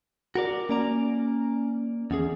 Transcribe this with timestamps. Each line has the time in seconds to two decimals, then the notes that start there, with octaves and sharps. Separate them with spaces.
0.35 F#4 A#4 D5
0.69 A#3 C#4 D5 A#5
2.11 E2 C#4 G#4